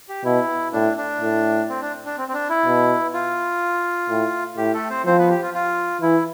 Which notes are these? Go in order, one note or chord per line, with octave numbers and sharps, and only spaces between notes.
G4
B2 E4
A2 D4
D4
A2
C4
D4
D4
C4
C4
D4
E4
B2
F4
A2
A2 G4
A3 A4
C4 C5
F3 C4 C5
B3 B4
G4
F4
F4
E3 E4